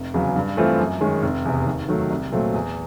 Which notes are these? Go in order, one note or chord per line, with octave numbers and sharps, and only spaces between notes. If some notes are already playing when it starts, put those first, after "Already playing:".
Already playing: F1
E2 C#3 F#3
G2
E3 A3 C4 F4
F#2
D#3 G#3 C#4
F1
E2 C3
D#2
D#3 F#3 A3
C2
A#2 F#3 A3 C4
E2